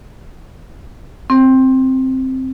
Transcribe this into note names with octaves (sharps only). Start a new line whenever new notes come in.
C4